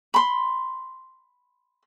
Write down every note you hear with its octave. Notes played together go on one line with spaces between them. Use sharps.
B5 C6